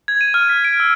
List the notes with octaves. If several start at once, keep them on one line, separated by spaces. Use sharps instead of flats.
G#6
D#7
F6
B6
D7
E6